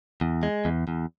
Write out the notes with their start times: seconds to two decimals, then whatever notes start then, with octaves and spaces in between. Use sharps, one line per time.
0.21 E2
0.43 G#3
0.65 E2
0.88 E2